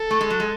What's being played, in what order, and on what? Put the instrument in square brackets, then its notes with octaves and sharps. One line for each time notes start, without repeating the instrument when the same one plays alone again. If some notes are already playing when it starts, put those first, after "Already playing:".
Already playing: [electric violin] A4
[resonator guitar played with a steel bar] A3
G#3
F#3
G#3